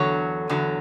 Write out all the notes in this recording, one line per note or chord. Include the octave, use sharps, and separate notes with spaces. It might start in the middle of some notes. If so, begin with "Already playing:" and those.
Already playing: E2 D3 F#3 C#5
E2 D3 F#3